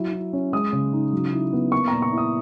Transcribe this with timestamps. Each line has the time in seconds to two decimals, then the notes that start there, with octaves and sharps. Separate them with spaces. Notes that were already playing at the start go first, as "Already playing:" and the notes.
Already playing: F#3 E4
0.12 E4
0.33 C#4
0.53 G#3 D#6
0.73 C#3
0.93 D#4
1.13 F#3
1.32 E4
1.53 B3
1.72 A#3 C#6
1.88 A#2 A#5
2.02 C#6
2.12 E4
2.18 D#6